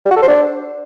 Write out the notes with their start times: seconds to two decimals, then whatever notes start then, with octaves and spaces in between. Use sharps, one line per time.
0.05 G3
0.11 F#4
0.16 A4
0.22 C5
0.27 D4